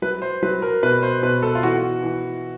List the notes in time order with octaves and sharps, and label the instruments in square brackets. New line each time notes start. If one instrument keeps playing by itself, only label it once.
[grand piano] F#3 B4
C5
F#3 B4
A#4
B2 B4
C5
B2 B4
A4
F4
E3 F#4
E3